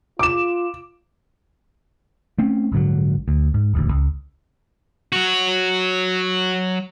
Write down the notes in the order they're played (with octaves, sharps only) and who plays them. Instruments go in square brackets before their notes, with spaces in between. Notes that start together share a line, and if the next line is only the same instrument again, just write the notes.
[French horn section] F4 [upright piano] D6 E7
[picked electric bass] A3 C4 C#4
A#1 G#2 D3 F#3
D2
G#2
D#1 A1 D2
C#2
[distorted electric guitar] F#3 F#4